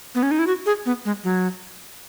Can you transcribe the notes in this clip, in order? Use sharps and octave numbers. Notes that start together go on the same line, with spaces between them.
B3
C#4
D#4
E4
F#4
G#4
B3
G#3
F#3